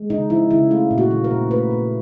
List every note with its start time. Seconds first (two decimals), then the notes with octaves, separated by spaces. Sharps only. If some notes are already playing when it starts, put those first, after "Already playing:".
Already playing: G#3
0.10 C#3 D#4
0.30 F3 E4
0.51 C#3 E4
0.71 A3 F4
0.91 A#2
0.98 F#4
1.11 F3
1.24 A#4
1.31 A#2
1.51 A3 B4
1.71 A#2